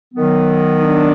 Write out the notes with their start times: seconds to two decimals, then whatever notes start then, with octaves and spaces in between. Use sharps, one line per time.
0.14 D#3 F#3 B3
0.83 D4